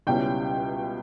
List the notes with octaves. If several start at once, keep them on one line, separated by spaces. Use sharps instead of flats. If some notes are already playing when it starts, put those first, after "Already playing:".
C#2 B2 G3 C#4 E4 G5